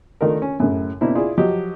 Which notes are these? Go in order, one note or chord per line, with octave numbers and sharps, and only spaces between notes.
D#3 A3 D4 F4 A#4
C#4
F#2 A2 C#3
B2 A#3 C4 D4 E4
E4 F4 G#4 D5
F3 F#3 G4 D#5